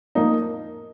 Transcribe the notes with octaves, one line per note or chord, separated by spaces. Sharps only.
F2 F3 A#3 D#4